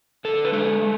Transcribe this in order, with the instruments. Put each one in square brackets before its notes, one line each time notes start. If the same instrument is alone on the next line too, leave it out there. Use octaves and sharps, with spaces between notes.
[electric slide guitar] D3 A4
B4
G#3 A4
G#3